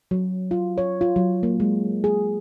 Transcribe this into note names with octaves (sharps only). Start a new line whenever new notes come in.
F#3
F4
C#5
F4
F#3
A#3
G#3
G#4